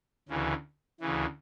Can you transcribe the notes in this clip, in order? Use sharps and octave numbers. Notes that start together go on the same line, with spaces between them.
D2 C#3 E3
D2 C#3 E3